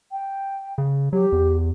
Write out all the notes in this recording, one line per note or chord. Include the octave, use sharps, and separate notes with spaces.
G5
C#3
F#3 G4
E2